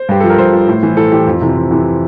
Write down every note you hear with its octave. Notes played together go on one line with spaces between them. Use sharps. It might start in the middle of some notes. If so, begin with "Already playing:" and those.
Already playing: C5
G2 G4
F3 A4
A#4
G2 C5
F3
A2
E3
A2 A4
E3 G4
F2
C3 E3
F2
C3 E3